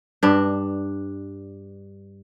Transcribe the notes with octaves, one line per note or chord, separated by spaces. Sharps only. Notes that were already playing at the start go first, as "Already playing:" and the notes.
G2 D4